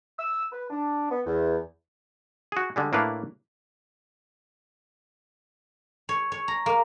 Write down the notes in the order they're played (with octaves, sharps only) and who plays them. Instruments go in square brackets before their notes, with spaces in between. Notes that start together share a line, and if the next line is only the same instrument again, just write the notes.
[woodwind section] E6
B4
D4
B3
E2
[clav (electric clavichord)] F#4 G#4
D3 G3 G#3
A2 A#3 D4 E4 B4 F5
[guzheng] C#5
C#5
A#5
A#3